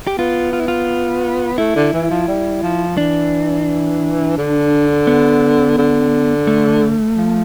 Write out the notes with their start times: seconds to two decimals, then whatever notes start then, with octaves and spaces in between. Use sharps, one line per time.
0.07 G4
0.18 B3 F4
0.53 F4
0.60 E4
0.68 F4
1.58 A3 E4
1.76 D3
1.93 E3
2.10 F3
2.28 G3
2.63 F3
2.97 E3 D4
4.38 D3
5.07 B3
5.78 D3
6.47 A3
7.17 F3